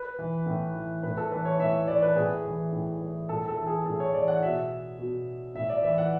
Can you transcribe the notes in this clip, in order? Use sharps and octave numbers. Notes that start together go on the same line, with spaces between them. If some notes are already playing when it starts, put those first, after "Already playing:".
Already playing: B4
E3
A2
E3
A2 B4
A4
E3 B4
C#5
A2 E5
E3 D5
B4
A2 G#4
E3
A2
E3
A2 A4
A4
E3
G#4
A2 A4
C#5
E3 D5
F#5
B2 E5
B2
A2 E5
D5
E3 E5
F#5